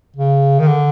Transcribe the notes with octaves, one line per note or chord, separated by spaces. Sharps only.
C#3
D#3
D3